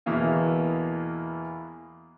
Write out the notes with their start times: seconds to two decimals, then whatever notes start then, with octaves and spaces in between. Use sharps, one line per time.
0.06 E2 B2 E3 A#3 B3